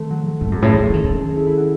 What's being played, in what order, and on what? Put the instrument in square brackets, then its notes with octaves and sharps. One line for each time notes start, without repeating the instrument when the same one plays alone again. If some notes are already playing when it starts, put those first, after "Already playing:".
Already playing: [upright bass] D#3 [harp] A3 C4
[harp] F#3
F#3
[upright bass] G#2 [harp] A3
[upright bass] F#2 [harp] G#3
[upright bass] A2 [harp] C4
[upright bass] E3 [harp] C#4
[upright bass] E3
[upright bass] D#3 [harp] D#4
[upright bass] D#3 [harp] A4
[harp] G#4
D#4
E4
E4
F#4